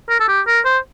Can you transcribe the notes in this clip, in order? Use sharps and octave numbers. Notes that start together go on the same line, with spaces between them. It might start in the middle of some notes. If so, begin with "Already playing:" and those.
A#4
A4
G4
A#4
C5